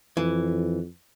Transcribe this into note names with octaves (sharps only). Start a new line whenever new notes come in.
F2 E3